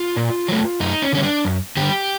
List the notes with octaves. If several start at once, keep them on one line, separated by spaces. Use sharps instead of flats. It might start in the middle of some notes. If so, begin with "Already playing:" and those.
Already playing: F4
A#2
F#3 A3
F#2 D#4
C#4
D3 G3 C#4
D4
F#2
D3 G3 G4